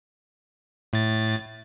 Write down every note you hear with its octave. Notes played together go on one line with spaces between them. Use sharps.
A2 A6